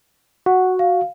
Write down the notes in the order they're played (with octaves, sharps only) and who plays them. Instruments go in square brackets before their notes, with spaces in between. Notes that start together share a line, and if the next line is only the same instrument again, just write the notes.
[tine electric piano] F#4 [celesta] F#5
[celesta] F5